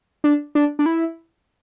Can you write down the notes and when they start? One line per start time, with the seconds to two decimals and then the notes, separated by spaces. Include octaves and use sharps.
0.24 D4
0.55 D4
0.79 D4
0.86 E4